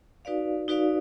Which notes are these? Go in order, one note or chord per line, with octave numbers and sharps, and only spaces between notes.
D#4 F#4 B4 D5 F5
D#4 F#4 B4 D5 F5